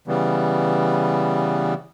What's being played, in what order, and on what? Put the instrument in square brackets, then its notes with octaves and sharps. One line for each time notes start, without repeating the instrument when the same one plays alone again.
[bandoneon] C#3 E3 G3 B3